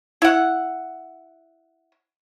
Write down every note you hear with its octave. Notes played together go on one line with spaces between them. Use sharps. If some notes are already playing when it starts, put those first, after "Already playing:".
E4 F#5